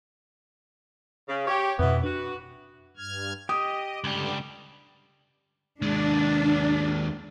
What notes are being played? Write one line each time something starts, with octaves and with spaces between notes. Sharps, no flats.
C#3
G4 C#5
F2 B2 E3 B3
D4 F#4 B4
G2 F6 G#6
G4 D#5 D#6
C#2 G2 D3 G3
D#2 G#3 D4